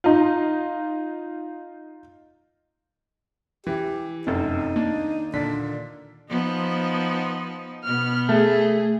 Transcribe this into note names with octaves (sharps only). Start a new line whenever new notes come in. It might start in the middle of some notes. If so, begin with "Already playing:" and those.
D#4 F4
E3 G4
F1 F#2 C4 D#4 A4
D#3 A#3 D4
A#2 D3 D4 B6
F3 B3 D#4
B2 B3 F6
A3 G#4